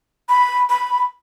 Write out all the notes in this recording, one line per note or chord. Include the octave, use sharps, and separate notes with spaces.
B5
B5